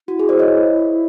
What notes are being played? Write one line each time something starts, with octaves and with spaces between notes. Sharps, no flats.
E4 F#4
G#4
C5 D5
C#5 D#5